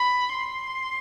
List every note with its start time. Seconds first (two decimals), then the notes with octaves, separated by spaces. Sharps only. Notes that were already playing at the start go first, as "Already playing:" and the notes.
Already playing: B5
0.33 C6